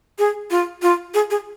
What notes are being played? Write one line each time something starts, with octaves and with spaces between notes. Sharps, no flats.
G#4
F4
F4
G#4
G#4